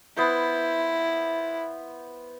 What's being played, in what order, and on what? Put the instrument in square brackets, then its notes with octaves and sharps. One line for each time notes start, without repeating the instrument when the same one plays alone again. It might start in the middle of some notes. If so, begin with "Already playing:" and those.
[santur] B3 C5 [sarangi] E4